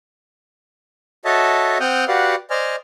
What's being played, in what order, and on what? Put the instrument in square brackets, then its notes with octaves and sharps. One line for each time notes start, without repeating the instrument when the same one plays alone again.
[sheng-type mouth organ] F#4 A4 C#5 D#5 E5 A5
C4 F#5 G5 D#6 F6 G6
F#4 G4 B4 D5 F5 F#5
C5 D5 D#5 G#5 F6